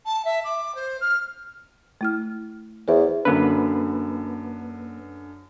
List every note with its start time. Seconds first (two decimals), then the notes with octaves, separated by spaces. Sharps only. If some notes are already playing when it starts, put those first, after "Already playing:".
0.06 A5
0.25 E5
0.44 D6
0.75 C5
1.01 F6
2.01 A3 E4 F6
2.88 E2 C5 E5
3.25 F#2 D3 A#3 B4